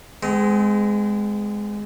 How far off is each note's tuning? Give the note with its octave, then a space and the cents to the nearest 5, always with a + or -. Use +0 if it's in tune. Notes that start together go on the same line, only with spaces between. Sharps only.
G#3 +0 C4 -40